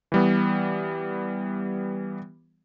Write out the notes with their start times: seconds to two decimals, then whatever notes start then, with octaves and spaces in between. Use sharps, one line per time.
0.12 E3 G3 B3